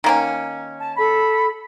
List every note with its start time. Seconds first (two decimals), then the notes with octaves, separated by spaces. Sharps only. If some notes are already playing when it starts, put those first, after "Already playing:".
0.04 D#3 A#3 C#4
0.79 A5
0.96 A4 B5